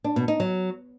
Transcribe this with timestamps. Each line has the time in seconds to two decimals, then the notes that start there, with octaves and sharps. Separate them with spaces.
0.04 D4
0.16 B2
0.28 D#4
0.40 F#3